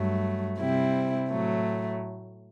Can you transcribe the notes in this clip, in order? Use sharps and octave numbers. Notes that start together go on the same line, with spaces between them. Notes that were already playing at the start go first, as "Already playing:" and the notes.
Already playing: G2 F#3 A3
C3 G3 C4 E4
A2 F#3 A3